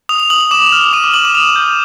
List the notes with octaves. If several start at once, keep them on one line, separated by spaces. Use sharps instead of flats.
D#6 F7
F7
D#6 F#7
F#7
D6 E7
F6
D6 D#7
F7
D6 F#7
E7
D#6 F7
G6